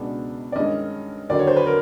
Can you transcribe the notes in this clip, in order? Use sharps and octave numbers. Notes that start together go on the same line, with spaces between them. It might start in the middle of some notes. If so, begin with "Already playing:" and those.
Already playing: C#2 B2 G#3 B3 D4
D5
G2 D#3 G#3 C#4 D#5
D#2 D3 F#3 D5
C#5
C5
B4
A#4